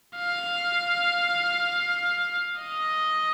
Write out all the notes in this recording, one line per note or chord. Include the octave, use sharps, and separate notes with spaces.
F5
D#5